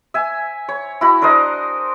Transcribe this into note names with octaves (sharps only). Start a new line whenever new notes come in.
E5 G#5
C#5
E4 F#4 B5
D4 A#4 C5 D#5